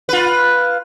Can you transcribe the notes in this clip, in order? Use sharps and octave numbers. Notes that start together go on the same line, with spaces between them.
F4 B4